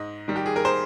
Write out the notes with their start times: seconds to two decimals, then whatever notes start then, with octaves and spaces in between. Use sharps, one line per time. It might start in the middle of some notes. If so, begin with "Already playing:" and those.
Already playing: G#2 D#5
0.28 D#3 G3
0.36 G4
0.46 G#4
0.56 A#4
0.65 C5